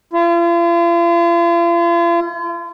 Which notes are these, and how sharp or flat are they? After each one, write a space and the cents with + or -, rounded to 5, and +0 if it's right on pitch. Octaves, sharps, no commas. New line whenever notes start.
F4 -40